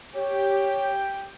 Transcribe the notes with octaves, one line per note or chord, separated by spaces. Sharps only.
G4 C#5 G5